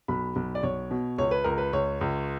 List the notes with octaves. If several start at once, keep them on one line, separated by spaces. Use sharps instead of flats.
B1 B5
B1
D5
B1 C#5
B2
C#2 C#5
B4
C#2 A#4
B4
C#2 C#5
C#2